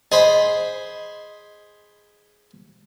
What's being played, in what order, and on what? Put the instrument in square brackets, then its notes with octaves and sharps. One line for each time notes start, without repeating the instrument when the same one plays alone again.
[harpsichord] G#4 C5 B5 [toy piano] D#5